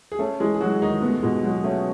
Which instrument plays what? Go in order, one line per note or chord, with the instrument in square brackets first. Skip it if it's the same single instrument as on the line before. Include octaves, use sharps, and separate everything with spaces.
[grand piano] G#4
[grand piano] A3 A4 [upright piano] C#4
[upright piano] E3 [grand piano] G#3 G#4
[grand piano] G#4
[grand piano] F#3 F#4 [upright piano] G#3
[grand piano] D#3 D#4 [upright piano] G#4
[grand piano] B2 B3 [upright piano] A3
[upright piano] B2 [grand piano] G#3
[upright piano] F#3 [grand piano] G#3
[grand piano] A3 [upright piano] C#4